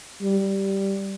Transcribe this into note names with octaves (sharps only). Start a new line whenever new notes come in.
G3